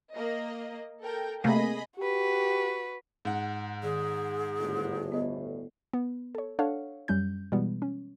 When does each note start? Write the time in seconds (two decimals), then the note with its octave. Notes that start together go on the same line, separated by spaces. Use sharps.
0.14 A#3 D#5
1.02 A4 A#4 G5
1.44 C3 A3 A#3 G#4 D#5 B5
1.98 F#4 G4 B4
3.25 G#2 F#5
3.83 D#3 G#4
4.60 G1 D2 A2
5.12 B3 D#5
5.93 B3
6.35 A4 C#5
6.59 D4 A4 C#5 F5 F#5
7.08 F#2 G3 C#4 G6
7.52 B2 E3 G3 G#3 B3
7.82 C#4